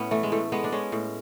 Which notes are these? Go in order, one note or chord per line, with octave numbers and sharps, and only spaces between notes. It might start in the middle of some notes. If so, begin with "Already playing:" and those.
Already playing: A2 B3 C#4
E3 A3
G#3
A2 A3
G#3 B3
D4
G#3 C#4
A2